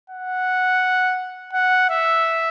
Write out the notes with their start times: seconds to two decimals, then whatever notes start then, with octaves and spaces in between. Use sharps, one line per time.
0.10 F#5
1.53 F#5
1.90 E5